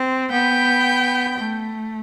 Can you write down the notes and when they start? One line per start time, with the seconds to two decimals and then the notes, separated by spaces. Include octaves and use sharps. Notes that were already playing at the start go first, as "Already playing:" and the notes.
Already playing: C4
0.31 B3 G5
1.38 A3